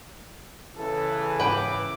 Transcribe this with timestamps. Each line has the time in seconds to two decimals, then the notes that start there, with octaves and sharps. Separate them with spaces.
0.76 C#3 E3 A4
1.40 G#2 B4 G5 D6